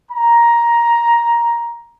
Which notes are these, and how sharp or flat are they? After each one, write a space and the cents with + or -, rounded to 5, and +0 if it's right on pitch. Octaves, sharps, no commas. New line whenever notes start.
A#5 +10